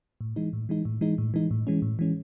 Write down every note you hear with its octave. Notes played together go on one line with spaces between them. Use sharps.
A2
E3 G#3 D#4
A2
E3 G#3 D#4
A2
E3 G#3 D#4
A2
E3 G#3 D#4
A2
E3 G#3 C#4
A2
E3 G#3 C#4